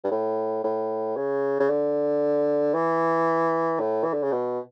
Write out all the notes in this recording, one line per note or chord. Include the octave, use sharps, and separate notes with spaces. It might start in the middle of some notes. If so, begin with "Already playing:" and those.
G2
A2
A2
C#3
C#3
D3
E3
A2
E3
D3
C#3
B2